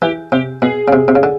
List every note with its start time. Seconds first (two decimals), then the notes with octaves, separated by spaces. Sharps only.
0.02 E3 G4
0.32 C3 G4
0.62 B2 G#4
0.88 C#3
0.93 C3
1.08 C3
1.15 C#3
1.23 D3